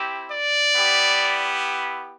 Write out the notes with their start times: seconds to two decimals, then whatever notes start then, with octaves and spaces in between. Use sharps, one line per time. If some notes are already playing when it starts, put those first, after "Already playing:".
Already playing: C4 E4 G4
0.31 D5
0.75 B3 E4 G4